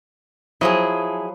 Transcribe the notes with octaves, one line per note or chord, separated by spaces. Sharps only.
F3 F#3 E4 G#4 D#5